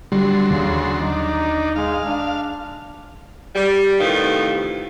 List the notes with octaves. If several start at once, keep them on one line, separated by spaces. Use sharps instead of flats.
D3 F#3 G3 C6
D#2 C#3
D4 D#4
G#3 F5
D4
G3
A2 C3 D#3 B3 F4